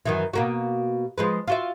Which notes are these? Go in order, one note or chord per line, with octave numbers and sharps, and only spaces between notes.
F#2 D#3 E3
B2 A#3 F#4
F3 G#3 B4
F4 F#4 E5